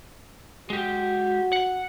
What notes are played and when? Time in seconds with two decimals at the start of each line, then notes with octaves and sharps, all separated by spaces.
0.70 G#3 F#4 G4
1.53 F#5